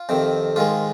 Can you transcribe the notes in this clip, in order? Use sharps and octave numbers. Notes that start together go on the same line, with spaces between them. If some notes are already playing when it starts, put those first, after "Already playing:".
Already playing: F4
F2 C3 D#3
G#2 D#3 G#3 F4